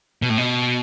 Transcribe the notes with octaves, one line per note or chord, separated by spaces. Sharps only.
B2
A2
B2